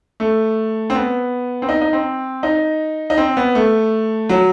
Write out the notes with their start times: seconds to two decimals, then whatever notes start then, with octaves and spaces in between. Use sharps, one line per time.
0.20 A3
0.90 C4
0.95 B3
1.62 C4
1.69 D#4
1.81 D#4
1.93 C4
2.43 D#4
3.10 D#4
3.17 C4
3.37 B3
3.55 A3
4.29 F#3